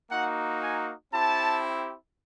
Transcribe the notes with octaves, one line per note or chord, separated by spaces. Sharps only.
A#3 D#4 F#4 F#5
G#5
C4 E4 G4 A5